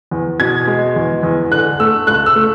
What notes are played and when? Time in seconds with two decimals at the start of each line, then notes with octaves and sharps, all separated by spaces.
0.11 E2
0.40 B2 G#6
0.67 G#3
0.96 E2
1.23 E2
1.51 D3 F#6
1.80 A3 E6
2.07 C#2 F#6
2.26 E6
2.36 A3